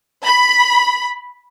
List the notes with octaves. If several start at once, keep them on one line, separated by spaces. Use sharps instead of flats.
B5